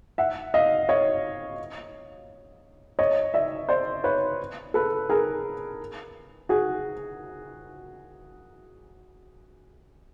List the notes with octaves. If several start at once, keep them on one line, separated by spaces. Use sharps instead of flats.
E5 F#5
D#5 F5
C#5 D#5
C#5 D#5
D5 E5
C5 D5
B4 C#5
A4 B4
G#4 A#4
F#4 G#4